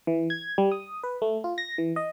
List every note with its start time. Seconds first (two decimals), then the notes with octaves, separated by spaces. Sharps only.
0.07 E3
0.30 G#6
0.58 G3
0.72 D#6
1.04 B4
1.22 A3
1.44 F4
1.58 A#6
1.78 E3
1.96 D#5